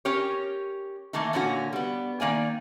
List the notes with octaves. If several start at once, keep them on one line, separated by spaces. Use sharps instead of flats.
C#4 G4 A#4 C#5
D#3 E3 A3 A#3 D#4
A#2 D3 A#3 C#4 F4 F#4
G3 B3
D#3 A#3 D5 G#5